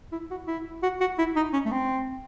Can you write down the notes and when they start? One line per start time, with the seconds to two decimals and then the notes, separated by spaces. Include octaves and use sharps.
0.12 E4
0.31 F#4
0.47 E4
0.83 F#4
1.00 F#4
1.18 E4
1.36 D#4
1.53 C#4
1.65 A3
1.72 C4